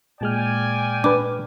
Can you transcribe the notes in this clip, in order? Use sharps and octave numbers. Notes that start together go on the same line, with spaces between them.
A#2 G#3 D5 G5 G#5 F6
D4 B4 D6